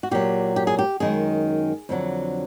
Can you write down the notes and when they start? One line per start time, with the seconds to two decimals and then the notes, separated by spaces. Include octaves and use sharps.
0.03 F#4
0.11 A#2 F#3 G4
0.56 G4
0.67 G#4
0.79 G4
1.00 F#2 D#3 G#3 G#4
1.89 F2 D3 F#3